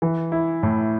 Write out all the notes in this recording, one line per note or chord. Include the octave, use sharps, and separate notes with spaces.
E3
E4
A2